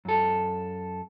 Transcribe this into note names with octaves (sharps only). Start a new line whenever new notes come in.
F#2 A4